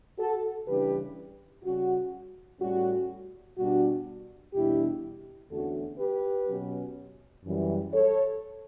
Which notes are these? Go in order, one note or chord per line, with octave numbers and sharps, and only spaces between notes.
F#4 A4
C#3 E3 G3 D4 G4 B4
C#3 G3 C#4 F#4
A2 G3 C#4 F#4
B2 G3 D4 F#4
E2 B2 G3 D4 E4 G4
E2 D3 A3 C#4 F#4 A4
G4 B4
B2 F#3 C#4
F#2 E3 G3
A4 C#5